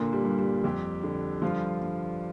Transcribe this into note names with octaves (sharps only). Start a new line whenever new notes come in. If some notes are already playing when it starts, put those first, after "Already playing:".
Already playing: A#2 D3 A#3
G3
G2
G3
F2 G3 G4
D3
G2 F3 F4
G2